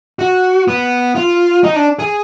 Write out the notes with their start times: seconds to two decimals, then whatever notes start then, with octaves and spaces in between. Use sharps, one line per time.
0.19 F#4
0.68 B3
1.15 F4
1.64 D#4
1.76 D4
1.99 G#4